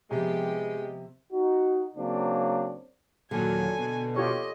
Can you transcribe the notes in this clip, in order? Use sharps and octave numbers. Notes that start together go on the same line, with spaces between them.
C3 F3 G#3 B3 G4
D#4 F#4
C#3 F#3 A#3 C4 D4
D#2 A#2 D3 F#3 G#5
B2
F4 G4 C#5 D#5